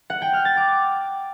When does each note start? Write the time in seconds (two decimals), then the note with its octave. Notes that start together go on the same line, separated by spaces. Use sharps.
0.10 F#5
0.22 G5
0.33 F6
0.45 A6
0.57 D6